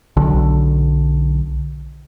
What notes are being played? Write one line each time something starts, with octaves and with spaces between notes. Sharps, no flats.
B1 D3